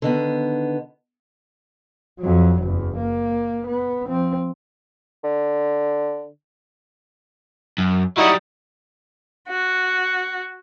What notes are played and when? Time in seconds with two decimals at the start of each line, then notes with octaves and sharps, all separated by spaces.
0.02 D3 D#3 B3
2.20 F2 F#3
2.62 F#1 E2
2.97 A#3
3.67 B3
4.07 F3 C4
5.24 D3
7.78 F#2
8.17 F#3 G3 D#4 E4 F#4 D#5
9.48 F#4